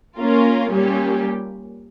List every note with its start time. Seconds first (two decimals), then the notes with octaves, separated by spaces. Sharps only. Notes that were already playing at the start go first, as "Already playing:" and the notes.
0.18 A#3 C#4 F4 A#4
0.71 A#2 G3 C#4 G4